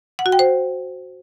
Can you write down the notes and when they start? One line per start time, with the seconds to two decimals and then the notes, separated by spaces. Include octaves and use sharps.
0.19 F#5
0.26 F#4
0.32 G5
0.39 C5